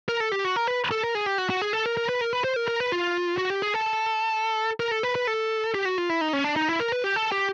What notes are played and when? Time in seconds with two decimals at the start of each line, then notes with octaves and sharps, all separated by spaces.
0.09 A#4
0.20 A4
0.32 G4
0.45 F#4
0.56 A#4
0.67 B4
0.91 A4
1.04 A#4
1.15 G#4
1.26 G4
1.38 F#4
1.50 F#4
1.62 G#4
1.73 A4
1.86 A#4
1.97 A#4
2.09 B4
2.21 A#4
2.33 B4
2.44 C5
2.56 A#4
2.68 A#4
2.80 B4
2.92 F4
3.38 F#4
3.50 G4
3.62 G#4
3.74 A4
4.80 A#4
4.91 A4
5.03 B4
5.15 B4
5.27 A4
5.75 G4
5.85 F#4
5.98 F4
6.10 E4
6.21 D#4
6.33 C#4
6.44 D4
6.56 D#4
6.69 E4
6.80 A#4
6.92 B4
7.04 G4
7.16 A4
7.32 G4